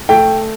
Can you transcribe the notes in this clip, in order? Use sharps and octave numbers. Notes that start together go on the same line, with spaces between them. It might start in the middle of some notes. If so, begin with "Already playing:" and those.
A3 G5